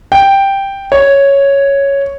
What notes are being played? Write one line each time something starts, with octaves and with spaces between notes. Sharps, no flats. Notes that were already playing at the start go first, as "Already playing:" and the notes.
G5
C#5